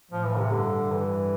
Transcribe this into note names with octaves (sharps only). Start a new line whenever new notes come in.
A2 F3
E3
C3
G2 D3
E3